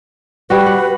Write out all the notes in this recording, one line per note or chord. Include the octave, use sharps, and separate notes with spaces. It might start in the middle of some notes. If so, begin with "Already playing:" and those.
G3 F#4 B4
F#5